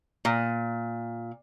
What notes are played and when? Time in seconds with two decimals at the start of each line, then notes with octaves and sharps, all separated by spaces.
0.25 A#2